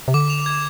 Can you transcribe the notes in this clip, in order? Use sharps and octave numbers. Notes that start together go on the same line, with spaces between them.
C3
D3 D6
F7
G#6